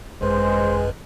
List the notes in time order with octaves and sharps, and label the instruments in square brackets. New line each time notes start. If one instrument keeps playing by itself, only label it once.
[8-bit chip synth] G#1 F#2 B4 [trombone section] G#3 [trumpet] C5